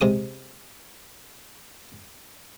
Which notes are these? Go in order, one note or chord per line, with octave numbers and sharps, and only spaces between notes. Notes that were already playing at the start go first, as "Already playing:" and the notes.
C3 G#3 D#6